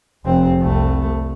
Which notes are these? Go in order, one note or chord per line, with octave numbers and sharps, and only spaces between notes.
F1 C4
C2 A3